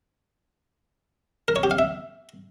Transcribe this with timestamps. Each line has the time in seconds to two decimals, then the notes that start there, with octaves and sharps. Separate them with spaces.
1.48 A#4
1.56 C#5
1.63 G4
1.71 F5
1.79 E5